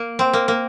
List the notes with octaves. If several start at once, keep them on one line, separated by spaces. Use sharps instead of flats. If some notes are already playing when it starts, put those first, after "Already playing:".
Already playing: A#3
C4
A#3
A#3